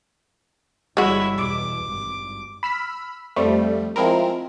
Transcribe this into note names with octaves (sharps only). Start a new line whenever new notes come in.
G1 E3 G3 G#3 E4 F#4 C#5
E2 B2 D6
G#1 G2
B5 E6 F6 B6
F2 F3 G3 A3
F3 G#3 C4 E4 A#4